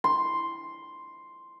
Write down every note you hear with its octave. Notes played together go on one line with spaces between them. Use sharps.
C6